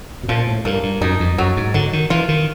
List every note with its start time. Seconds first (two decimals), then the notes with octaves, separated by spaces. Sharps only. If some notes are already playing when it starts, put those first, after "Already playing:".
0.23 B2
0.28 A#2 F3
0.47 A2
0.65 G2 A#3
0.83 G2
1.01 F#2 D#4
1.20 F2
1.38 F#2 F#3
1.57 G#2
1.74 D3 F#3
1.93 D#3
2.10 E3 F4
2.29 D#3